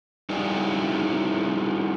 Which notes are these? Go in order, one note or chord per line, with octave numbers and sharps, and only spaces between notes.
G3 D#4 E4 F#4 G#4 D5